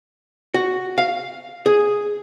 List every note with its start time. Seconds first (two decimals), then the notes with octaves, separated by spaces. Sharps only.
0.54 F#4
0.98 F5
1.66 G#4